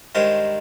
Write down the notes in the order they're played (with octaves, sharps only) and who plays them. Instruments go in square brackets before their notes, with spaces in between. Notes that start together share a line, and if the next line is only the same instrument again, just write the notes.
[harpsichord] G2 D#3 G#3 A#4 C5